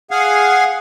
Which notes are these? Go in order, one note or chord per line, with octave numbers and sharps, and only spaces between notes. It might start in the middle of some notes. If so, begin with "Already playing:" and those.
G#4 F5 F#5 G#5